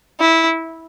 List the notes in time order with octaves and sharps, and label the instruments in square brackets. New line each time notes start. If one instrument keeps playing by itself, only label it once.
[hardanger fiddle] E4